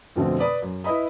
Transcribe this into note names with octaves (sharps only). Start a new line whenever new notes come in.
F2 B2 D3 A3 C4
B4 D5 B5 D#6
F#2
E4 B4 D#5 B5 D#6